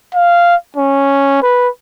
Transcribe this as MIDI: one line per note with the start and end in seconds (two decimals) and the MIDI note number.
0.15 0.55 77
0.76 1.40 61
1.42 1.69 71